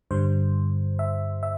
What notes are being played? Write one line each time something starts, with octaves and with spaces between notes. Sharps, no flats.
G2 D3 G3 C5
E5
E5